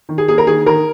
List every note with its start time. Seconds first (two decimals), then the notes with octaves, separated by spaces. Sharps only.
0.09 D#3
0.18 G#4
0.28 A#3 G#4
0.38 A#4
0.47 D#3 G#4
0.66 D#3 A#4